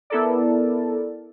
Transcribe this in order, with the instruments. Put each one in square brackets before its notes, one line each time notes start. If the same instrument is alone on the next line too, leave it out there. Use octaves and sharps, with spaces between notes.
[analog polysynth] B3 E4 A4 A#4 D5